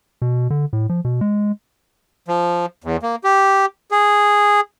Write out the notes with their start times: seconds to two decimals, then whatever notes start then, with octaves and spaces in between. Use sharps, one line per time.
0.22 B2
0.50 D3
0.73 A2
0.89 F3
1.05 B2
1.21 G#3
2.28 F3
2.84 E2
3.02 A#3
3.24 G4
3.91 G#4